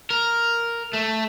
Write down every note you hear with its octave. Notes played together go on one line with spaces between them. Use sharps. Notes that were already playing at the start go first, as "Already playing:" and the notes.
A#4
A3